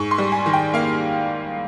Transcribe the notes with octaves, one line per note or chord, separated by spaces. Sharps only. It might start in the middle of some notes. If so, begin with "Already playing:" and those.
Already playing: G#2 C#6
C6
G3
G#5
D#3
G5
A#3 F5